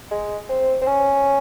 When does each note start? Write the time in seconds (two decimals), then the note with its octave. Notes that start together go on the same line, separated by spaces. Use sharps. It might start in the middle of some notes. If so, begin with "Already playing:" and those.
0.11 G#3
0.49 C4
0.82 C4
0.87 C#4